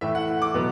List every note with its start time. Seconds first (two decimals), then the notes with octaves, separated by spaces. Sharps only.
0.01 A2 E3 A3 E5
0.15 F#5
0.42 D6
0.54 B2 F#3 B3